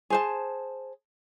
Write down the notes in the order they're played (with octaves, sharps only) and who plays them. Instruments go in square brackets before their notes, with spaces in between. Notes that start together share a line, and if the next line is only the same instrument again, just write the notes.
[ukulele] G#4 C5 A5